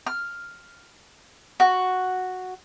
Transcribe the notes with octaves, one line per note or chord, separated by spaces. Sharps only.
F6
F#4